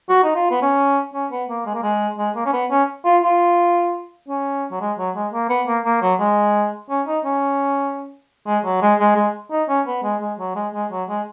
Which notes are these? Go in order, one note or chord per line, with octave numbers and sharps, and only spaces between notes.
F#4
D#4
F4
B3
C#4
C#4
B3
A#3
G#3
A#3
G#3
G#3
A#3
C#4
B3
C#4
F4
F4
C#4
F#3
G#3
F#3
G#3
A#3
B3
A#3
A#3
F#3
G#3
C#4
D#4
C#4
G#3
F#3
G#3
G#3
G#3
D#4
C#4
B3
G#3
G#3
F#3
G#3
G#3
F#3
G#3